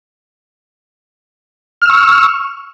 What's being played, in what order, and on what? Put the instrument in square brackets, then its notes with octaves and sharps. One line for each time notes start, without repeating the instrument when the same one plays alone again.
[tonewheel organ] F6
E6
C#6